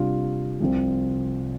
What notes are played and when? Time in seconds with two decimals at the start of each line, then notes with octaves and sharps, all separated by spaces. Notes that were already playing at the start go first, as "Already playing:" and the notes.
Already playing: C3 G3 D4 F4
0.60 C2 C3 F3 C4 F4